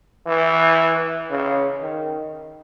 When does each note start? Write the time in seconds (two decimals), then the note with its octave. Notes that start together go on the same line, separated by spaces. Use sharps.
0.26 E3
1.31 C#3
1.82 D#3